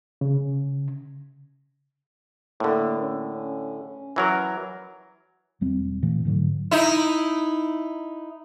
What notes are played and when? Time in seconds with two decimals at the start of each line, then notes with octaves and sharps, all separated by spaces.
0.21 C#3
2.60 A2 D3 A#3
3.01 C#4
4.16 E3 F#3 A#4
5.61 E1 G3 C4
6.02 A#2 E3 A3
6.25 G#2 D3 F#3
6.71 D#4 E4